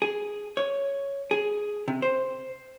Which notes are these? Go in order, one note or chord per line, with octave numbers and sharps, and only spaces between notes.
G#4
C#5
G#4
C3
C5